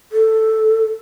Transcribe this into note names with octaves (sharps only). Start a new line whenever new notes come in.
A4